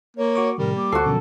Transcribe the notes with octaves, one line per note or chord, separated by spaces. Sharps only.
A#3 C#5
F#4 C#6 D6
A2 C3 D#3 G3 A#4
A#3 D6
D2 F#4 A4 C5 C7
F#2 B2 D3 F3